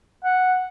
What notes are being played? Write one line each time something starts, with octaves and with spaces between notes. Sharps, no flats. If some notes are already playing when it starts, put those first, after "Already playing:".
F#5